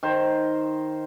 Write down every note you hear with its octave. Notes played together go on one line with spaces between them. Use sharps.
D#3 C5